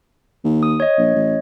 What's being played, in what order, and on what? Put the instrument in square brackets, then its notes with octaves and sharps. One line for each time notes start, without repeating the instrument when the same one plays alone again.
[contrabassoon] D#2
[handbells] D#6
C#5 D#5
[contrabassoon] A#1
A1